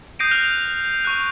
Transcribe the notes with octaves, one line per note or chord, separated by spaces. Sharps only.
D#6 G6 A#6 C7 D7 D#7
F6 F#6 A#6 F7
C#6 F#6